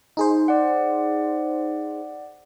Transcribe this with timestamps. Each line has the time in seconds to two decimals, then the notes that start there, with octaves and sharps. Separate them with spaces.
0.17 D#4 G#4 C5
0.48 D5 F#5